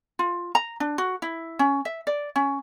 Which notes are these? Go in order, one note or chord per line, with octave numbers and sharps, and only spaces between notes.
F4
A#5
D4
F#4
E4
C#4
E5
D5
C#4